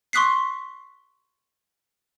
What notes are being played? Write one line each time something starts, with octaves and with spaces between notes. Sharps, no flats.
C6 C#6 D#6 F#6 B6 C7